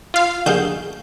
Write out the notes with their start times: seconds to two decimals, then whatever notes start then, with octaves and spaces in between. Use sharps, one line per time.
0.14 F4 F5
0.46 D3 G#4 F5 G6